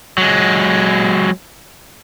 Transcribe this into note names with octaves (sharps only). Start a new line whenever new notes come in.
F#3 G#3